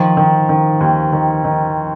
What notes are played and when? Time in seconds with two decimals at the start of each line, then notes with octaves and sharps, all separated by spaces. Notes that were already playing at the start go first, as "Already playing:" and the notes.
Already playing: D#3 F3
0.17 D#3
0.49 D#3
0.80 D#2
1.12 D#3
1.44 D#3